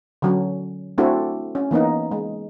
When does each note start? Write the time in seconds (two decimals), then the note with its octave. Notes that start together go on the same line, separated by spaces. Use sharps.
0.22 D3 F#3 C#4
0.98 A3 C4 D4 E4 F#4 A4
1.55 C#4
1.71 E3 A#3 B3 D#4
2.11 G#3